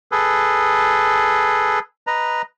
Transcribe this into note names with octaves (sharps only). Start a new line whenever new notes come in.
G#4 A4 B4
B4 D#5 A#5